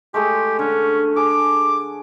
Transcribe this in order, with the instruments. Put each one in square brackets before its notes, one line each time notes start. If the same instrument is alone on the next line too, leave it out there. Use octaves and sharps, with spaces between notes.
[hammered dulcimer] G#3 A3 G#4 [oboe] G4
[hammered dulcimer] D3 [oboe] C#4
[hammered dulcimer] G#4 A5 [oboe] D6